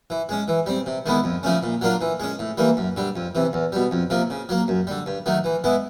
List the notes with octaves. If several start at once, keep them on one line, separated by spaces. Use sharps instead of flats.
E3
G#3 C#4
E3
G3 C4
C3
D#3 G#3 B3 E4
F2
C#3 F3 A3 C#4
A#2
F#3 A#3 D4 F4
E3
G#3 C#4
A2
E3 G3 A#3
F#2
D3 G3
F2
C3 E3
E2
B2 G3
F2
C3 F3 A#3
C#3
F#3 A#3
F#2
D3 G3
G2
D#3 F#3 A3
E3
G#3 B3 E4